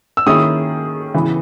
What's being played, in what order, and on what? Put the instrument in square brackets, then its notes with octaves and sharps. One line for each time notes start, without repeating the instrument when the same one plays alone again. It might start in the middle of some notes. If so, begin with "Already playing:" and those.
[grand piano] E6
[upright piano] D#3 A#3 C#4 E4 G#4 [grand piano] D#6
[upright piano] C#3 E3 B3